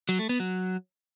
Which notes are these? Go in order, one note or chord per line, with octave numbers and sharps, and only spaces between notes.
F#3
A3
B3
F#3